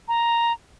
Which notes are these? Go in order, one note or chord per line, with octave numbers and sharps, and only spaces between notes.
A#5